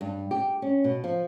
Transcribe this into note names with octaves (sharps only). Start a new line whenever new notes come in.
G2
G4
C#4
B2
F3